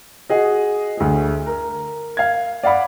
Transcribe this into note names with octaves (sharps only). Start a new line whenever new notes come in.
F#4 G#4 D#5
D2 G#4
A#4
F5 G#6
D5 F5 F#5 B5 D6